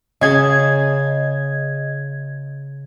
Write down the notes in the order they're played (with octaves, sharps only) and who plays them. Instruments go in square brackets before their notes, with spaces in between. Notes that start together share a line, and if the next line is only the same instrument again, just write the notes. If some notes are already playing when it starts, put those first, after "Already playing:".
[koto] C#3 G#4 A5 [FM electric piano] D#5 G#6